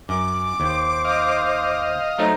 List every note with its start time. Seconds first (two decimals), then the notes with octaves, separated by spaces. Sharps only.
0.09 F#2 D6
0.60 D#2 C5
1.05 D#5 F5
2.19 F#3 A3 D#4 C5 A#5